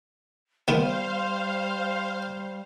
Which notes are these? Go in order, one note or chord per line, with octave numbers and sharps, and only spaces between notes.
D#3 G3 B3 C5 F5